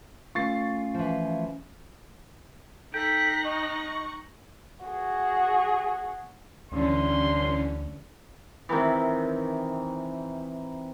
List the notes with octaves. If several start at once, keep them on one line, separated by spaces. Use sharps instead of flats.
A3 C#4 F4 C#6 A6 C7
E3 F3
D#4 A4 G5 F#6 A#6 B6
D#5 C#6
F#4 G#4
D2 D3 E3 G3 C#4 C6
C3 D#3 E3